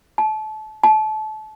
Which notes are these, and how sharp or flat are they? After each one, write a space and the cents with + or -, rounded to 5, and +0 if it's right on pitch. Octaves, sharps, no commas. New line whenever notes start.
A5 -30
A5 -30